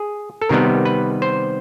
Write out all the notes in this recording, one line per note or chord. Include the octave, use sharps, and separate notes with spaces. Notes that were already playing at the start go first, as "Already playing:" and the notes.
Already playing: G#4
A4
C3 D#3 G3 B3 A#4
B4
C5